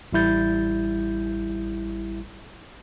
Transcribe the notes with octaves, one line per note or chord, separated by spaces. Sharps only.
A1 G3 E4 G6 A6